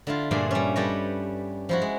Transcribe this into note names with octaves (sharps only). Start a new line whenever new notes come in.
D3 E4 F4
G2 A#2 A3 G#4 B4 D5
G3 C#4
G3 G4 A4 B4 C#5 D#5
F3 E4 F#4
G#3